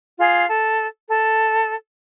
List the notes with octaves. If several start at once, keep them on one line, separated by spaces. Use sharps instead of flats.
F4 G#4
A4
A4